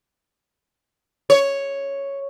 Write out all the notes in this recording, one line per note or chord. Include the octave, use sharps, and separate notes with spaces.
C#5